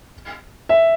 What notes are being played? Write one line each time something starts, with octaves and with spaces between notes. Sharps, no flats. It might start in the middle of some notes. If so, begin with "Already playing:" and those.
E5